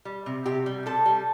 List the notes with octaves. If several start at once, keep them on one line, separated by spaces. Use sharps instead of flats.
G3
C3
C3 G4
G3
C3 A4
G3